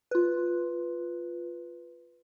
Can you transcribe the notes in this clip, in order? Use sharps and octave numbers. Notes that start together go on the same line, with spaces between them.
F4 B4